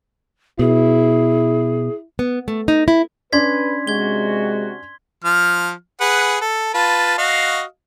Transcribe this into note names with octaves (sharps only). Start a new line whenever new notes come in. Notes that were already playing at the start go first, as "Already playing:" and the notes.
B2 E4 G#4
B3
A3
D#4
E4
C#4 D4 B4 D5 C6 G#6 B6
C3 G#3 F#4 G#6 G7
F3 F6
G#4 B4 F#5
A4
F4 B4 A5
F#4 D#5 F5